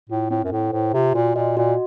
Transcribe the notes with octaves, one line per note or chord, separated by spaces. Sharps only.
A2 F4
A2 C4
F#2
A2 A4
A2 C5
C3 F4
A#2 F#4
A#2 D#5
A#2 F#4